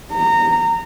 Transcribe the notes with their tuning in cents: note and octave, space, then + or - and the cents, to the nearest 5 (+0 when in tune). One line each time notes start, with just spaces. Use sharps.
A#5 -20